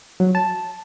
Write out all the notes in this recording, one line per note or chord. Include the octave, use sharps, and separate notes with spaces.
F#3
A5